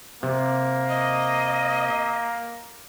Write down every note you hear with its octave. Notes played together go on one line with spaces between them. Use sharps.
C3 A#3
D#5